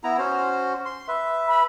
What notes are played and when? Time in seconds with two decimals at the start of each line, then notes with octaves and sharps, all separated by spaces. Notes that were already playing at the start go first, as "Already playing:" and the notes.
0.04 B3 E4 A#5
0.19 C#4 F#4 C5
0.85 C6
1.08 B4 E5
1.47 B5